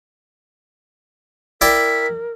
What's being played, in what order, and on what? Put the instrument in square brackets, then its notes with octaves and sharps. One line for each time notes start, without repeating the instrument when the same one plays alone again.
[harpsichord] E4 D5 G5 [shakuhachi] A#4 [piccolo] B6